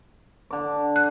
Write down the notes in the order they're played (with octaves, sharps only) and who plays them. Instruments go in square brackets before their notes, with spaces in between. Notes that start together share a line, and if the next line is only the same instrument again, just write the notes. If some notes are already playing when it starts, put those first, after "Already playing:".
[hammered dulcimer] D3 D6
[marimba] F#6